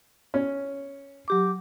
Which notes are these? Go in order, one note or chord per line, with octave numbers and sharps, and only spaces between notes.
C#4
F#3 G4 D6